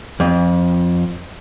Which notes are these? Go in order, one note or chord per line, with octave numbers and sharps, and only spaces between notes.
F2